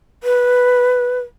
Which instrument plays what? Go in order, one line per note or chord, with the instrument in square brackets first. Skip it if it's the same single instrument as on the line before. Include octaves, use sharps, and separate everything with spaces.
[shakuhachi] B4